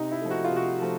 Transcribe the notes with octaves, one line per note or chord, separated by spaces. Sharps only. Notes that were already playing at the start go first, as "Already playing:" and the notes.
Already playing: C3 D#4
E4
F3 A3
F#4
F4
C3
F#4
F3 A3